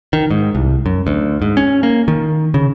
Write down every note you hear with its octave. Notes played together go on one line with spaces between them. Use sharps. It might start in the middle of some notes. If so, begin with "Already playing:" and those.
D#3
G#2
C2
F#2
D2
G#2
C#4
A#3
D#3
C#3